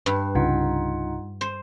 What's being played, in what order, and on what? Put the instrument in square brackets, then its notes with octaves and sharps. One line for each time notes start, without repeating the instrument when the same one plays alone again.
[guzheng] G2 [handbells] B4
[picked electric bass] C2 C#3 [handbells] D#4 F4 F#5
[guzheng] C5